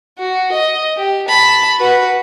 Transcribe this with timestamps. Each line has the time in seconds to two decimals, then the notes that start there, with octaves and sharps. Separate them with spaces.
0.19 F#4
0.52 D#5
0.97 G4
1.28 A5 B5
1.78 F#4 B4